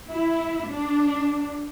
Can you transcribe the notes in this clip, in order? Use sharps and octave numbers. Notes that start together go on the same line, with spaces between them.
E4
D4